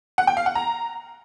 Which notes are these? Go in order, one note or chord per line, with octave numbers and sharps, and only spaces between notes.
F#5
G5
F5
F#5
A#5